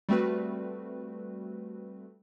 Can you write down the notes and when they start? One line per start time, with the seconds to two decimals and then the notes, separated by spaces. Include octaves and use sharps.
0.09 G3 A3 C4 F#4 B4